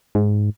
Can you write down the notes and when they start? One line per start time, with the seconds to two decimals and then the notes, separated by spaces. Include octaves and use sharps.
0.15 G#2